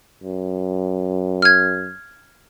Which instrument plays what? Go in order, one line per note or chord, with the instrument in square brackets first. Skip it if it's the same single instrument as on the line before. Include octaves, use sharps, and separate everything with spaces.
[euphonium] F#2
[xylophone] F6 G#6